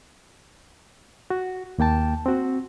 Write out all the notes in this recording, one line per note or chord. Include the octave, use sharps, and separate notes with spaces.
F#4
D#2 A#3 G5 A5
C4 F#4